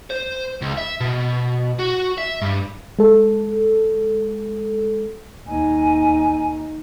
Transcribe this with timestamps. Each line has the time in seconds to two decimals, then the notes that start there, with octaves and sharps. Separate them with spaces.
0.11 C5
0.62 C#2
0.78 E5
1.00 B2
1.79 F#4
2.18 E5
2.41 G2
2.99 G#3 A4
5.47 D#2 D#4 G#5